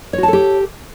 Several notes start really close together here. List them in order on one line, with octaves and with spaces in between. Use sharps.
C#5 F#4 A5 A4 G4